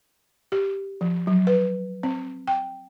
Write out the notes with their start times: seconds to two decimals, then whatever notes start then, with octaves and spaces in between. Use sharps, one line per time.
0.52 G4
1.01 F3
1.27 F#3
1.47 B4
2.03 C4
2.47 G5